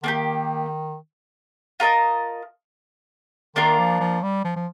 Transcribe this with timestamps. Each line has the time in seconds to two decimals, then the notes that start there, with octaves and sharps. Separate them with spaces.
0.03 D#3 A#3 D4 G4
1.80 F4 A#4 D#5 A5
3.56 D#3 A#3 D4 F4 A#4
3.78 F3
4.00 F3
4.23 G3
4.44 F3
4.56 F3